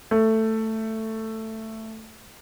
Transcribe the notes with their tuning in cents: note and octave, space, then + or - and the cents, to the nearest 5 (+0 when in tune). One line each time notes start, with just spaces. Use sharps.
A3 +10